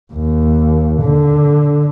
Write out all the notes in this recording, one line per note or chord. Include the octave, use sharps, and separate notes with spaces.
D#2
D3